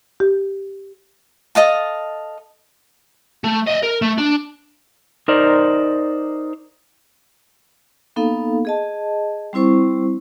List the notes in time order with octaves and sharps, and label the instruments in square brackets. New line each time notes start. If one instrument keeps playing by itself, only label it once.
[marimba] G4
[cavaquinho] A4 D#5 F5 A5
[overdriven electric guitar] A3
D#5 E5
A#4
A3
D4
[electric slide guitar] D#4 A#4 C5 D5
[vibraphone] A#3 B3 D#4 A4 F5
G#4 D#5 A5
G3 C4 E4 C5 C#6